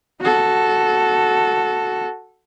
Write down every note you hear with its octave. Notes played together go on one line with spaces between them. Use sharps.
F#4 A4